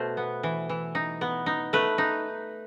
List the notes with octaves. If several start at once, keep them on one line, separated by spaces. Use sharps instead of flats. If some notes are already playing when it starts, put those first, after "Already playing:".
Already playing: B2 A3 C5
B3
E3
E3
D#4
B3
D#4
A3 B4
D#4